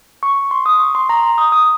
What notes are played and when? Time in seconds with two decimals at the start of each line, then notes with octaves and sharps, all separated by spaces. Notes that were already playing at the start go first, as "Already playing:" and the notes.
0.23 C#6
0.51 C6
0.66 D#6
0.80 C#6
0.95 C6
1.09 A#5
1.24 C6
1.38 D#6
1.52 D#6